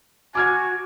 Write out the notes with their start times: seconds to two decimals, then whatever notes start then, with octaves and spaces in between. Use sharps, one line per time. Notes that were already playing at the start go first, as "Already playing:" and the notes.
0.35 F#4 G#5 D6 F6 G#6